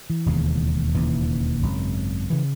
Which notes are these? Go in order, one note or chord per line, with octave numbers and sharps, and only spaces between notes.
E3
E1 D#2 C#3
E1 D#2 C#3 E3
G#1 F#2 C#3
C#3 E3